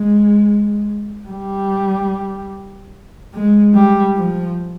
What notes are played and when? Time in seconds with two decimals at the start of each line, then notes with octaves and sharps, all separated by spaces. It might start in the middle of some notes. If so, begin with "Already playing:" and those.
Already playing: G#3
1.28 G3
3.34 G#3
3.74 G3
4.16 F3